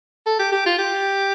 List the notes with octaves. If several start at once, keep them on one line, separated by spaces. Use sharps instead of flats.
A4
G4
G4
F4
G4